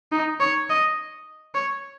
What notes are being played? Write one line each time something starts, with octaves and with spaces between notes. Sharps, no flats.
D#4
C#5
D#5
C#5